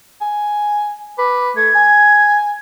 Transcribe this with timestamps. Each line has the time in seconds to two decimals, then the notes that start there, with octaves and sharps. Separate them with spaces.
0.21 G#5
1.18 B4 D6
1.57 A3 G#6
1.75 G#5